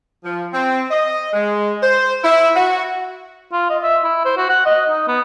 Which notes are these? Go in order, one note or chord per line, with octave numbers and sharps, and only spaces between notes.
F3
C4
D#5
G#3
C5
E4
F#4
F4
D#5
E5
E4
C5
F#4
F#5
D#5
D#4
B3